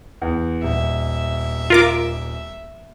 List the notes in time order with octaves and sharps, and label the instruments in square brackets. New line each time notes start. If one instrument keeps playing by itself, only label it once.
[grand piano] E2
[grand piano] D#1 [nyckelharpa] E5
[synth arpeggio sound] F4 A#4 D6